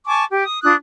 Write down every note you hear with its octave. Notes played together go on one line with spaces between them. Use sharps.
G#5 A5 C#6 D6
G4
D#6
D4 F4 D#6 F#6